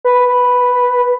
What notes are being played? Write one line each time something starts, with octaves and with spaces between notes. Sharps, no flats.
B4